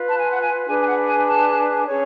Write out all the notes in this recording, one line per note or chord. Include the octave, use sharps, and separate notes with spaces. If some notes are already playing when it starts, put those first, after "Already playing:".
Already playing: F4 B4
A5
G#5
F#5
G#5
D4 G#4 B4 G#5
G#5
F#5
G#5
A5
C#4 G#4 C#5